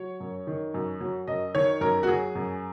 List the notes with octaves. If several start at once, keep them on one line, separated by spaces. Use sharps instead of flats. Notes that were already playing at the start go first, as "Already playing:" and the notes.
Already playing: F#3 C#5
F#2
D#3
F#2
F#3
F#2 D#5
D#3 C#5
F#2 A#4
F#4
F#3 G#4
F#2